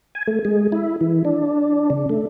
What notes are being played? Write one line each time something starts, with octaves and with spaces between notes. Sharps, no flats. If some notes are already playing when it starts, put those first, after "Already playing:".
G#5
A3
G#3
E4
E3
D4
C#3
A3